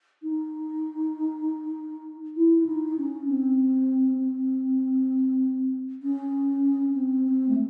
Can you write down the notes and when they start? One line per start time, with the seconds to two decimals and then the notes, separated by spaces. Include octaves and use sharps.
0.23 D#4
2.36 E4
2.66 D#4
2.97 C#4
3.28 C4
4.19 C4
6.03 C#4
6.94 C4
7.24 C4
7.49 A3